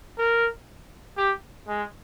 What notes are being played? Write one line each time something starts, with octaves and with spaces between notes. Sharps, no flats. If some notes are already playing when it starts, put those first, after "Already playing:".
A#4
G4
G#3